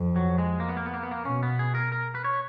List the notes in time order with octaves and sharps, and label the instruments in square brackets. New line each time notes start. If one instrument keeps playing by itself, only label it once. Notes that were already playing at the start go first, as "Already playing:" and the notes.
Already playing: [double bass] F2
[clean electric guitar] F#3
G#3
A#3
B3
A#3
B3
A#3
B3
A#3
[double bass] B2 [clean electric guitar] C#4
[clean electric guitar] B3
G#4
A#4
A#4
B4
C#5